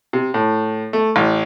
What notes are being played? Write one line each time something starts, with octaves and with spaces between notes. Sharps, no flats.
C3
A2
A3
A1